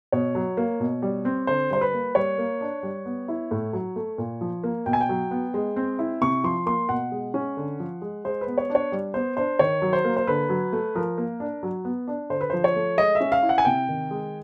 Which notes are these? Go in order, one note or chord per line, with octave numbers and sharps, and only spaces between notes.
B2 C#5
F#3
A#3
B2
G3
C4
D3 C5
G3 C5
B4
A#3
G3 C#5
A#3
D4
G3
B3
E4
A2
F#3
A3
A#2
F3
A#3
B2 G5
G#5
G5
F#3
B3
G#3
C4
E4
C3 C#6
F3 C6
A#3 C6
B2 F#5
G#3
C#4
D3
F3
G#3
G#3 C5
B4
B3
C#5
D4
C#5
G3
B3 C5
D4 C5
D#3 C#5
F#3
C5
A#3
C5
D3 B4
F#3
A3
F3 A#4
A#3
D4
F#3
B3
D4
D3 C5
B4
F3 C5
C#5
A3
G#3 D#5
E5
C#4
F5
E4
F#5
G#5
C3 G5
D#3
G#3